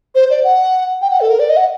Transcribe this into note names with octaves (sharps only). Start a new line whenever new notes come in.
C5
D5
F#5
G5
F#5
A4
A#4
D5
D#5
F#5